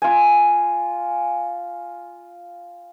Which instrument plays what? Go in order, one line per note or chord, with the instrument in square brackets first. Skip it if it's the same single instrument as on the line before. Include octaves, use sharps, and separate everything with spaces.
[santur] F4 G#5